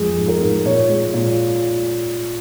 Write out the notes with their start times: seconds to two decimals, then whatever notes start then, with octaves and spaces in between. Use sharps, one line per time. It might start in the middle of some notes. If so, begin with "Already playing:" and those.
Already playing: F2 G#3 G#4
0.17 G#2
0.28 A#4
0.41 G#2
0.65 A#2 C#5
0.89 G#3
1.13 A#2